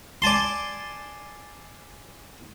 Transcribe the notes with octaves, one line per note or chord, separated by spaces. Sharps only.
D5 G#5 A5 C6